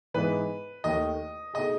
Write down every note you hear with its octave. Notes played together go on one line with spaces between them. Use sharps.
G#2 E3 B3 D#4 B4
D#2 D#3 A3 D#5
B2 A3 D#4 G#4 D#5